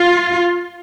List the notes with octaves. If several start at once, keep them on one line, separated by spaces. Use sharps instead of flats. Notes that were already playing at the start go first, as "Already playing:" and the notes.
Already playing: F4